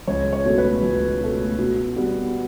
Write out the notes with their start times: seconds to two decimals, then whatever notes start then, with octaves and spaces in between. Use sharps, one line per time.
0.07 C#2 C#5
0.33 C#5
0.45 B2 A3
0.58 B4
0.83 C#2
1.21 B2 A3
1.59 B2
1.96 G3 B3